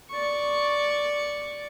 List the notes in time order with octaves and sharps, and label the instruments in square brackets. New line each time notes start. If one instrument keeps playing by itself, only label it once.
[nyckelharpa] D5 C#6